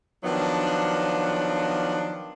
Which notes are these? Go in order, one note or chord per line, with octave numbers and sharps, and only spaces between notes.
D#3 F3 F#3 B3 D4